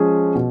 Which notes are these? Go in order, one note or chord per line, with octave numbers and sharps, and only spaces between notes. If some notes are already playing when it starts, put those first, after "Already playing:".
Already playing: F3 G#3 C#4 G#4
B2